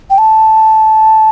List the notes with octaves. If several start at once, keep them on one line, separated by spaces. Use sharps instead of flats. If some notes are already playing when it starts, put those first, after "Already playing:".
G5
A5